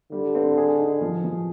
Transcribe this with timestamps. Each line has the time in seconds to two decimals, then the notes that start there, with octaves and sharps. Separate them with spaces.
0.12 D3 G3
0.35 C4
0.57 G#4
0.79 D#4
1.01 F3
1.24 F3